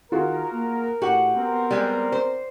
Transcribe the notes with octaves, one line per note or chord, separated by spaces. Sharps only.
D#3 F4 F#4 G#4 A#4
A#3
A2 F#4 G4 F#5
B3 C4 A#4
G3 G#3
C5